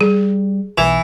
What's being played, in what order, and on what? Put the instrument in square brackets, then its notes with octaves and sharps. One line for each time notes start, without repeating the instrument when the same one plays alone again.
[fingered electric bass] G3 [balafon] G#4
[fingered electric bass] B1 [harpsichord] E3